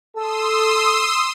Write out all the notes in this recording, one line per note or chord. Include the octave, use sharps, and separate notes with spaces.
A4 C6 D#6 E6